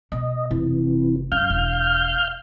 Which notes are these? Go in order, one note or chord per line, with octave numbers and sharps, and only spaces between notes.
B2 D#5
F1 C3 E3
F#2 F5 F6 G6
E1